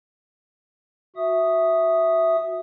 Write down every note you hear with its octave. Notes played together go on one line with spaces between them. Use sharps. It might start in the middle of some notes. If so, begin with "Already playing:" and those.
F#4 E5 D#6